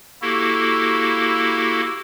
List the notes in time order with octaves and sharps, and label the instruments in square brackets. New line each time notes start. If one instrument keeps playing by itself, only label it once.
[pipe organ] A#3 E4 F#4 G4 A4